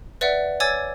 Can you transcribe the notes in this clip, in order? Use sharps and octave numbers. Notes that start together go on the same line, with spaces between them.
B4 D5 E5 F#5
C#5 G#5 D6 E6 G#6 A6